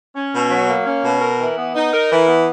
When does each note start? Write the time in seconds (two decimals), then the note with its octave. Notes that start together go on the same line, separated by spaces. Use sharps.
0.15 C#4
0.33 B2
0.50 F#3
0.68 A#3
0.86 C#4
1.04 B2
1.21 A#4
1.39 E3
1.57 B3
1.75 D#4
1.93 A#4
2.11 E3
2.28 B3